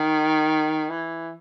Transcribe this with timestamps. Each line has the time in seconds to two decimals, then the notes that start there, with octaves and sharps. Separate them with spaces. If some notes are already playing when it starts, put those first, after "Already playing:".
Already playing: D#3
0.90 E3